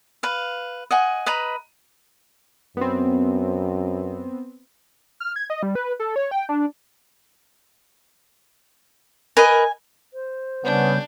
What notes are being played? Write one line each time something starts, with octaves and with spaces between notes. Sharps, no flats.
B4 F5
D#5 F#5 G#5
B4 D#5 A#5 B5
F#2 B3 C4
F6
G#6
D#5
G3
B4
A4
C#5
G5
D4
A#4 B4 D#5 G#5
C5
C#3 G3 B3 C#4 D4 G6